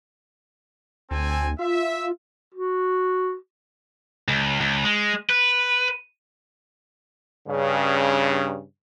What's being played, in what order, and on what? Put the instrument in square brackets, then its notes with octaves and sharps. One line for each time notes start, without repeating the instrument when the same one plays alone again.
[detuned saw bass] D2 [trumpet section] C4 A4 G#5
[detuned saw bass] F4 [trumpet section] E5
[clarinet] F#4
[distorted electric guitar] C#2
C#2
G#3
B4
[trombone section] G2 C#3